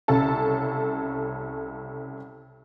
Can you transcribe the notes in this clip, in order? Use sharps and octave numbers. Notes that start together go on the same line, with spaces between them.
C2 C#3 C#4 A4 A5